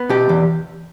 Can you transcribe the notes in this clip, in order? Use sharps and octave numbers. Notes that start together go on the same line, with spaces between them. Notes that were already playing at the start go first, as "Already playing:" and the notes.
Already playing: B3
B2 G4
E2